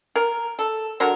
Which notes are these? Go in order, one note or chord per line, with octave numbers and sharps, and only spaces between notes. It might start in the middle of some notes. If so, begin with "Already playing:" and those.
A#4
A4
D3 F#3 A#4